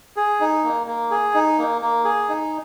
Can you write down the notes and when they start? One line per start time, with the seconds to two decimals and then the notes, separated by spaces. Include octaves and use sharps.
0.17 G#4
0.40 D#4
0.64 A#3
0.87 A#3
1.11 G#4
1.34 D#4
1.58 A#3
1.82 A#3
2.05 G#4
2.29 D#4